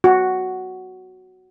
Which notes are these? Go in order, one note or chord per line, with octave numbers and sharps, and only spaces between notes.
F#4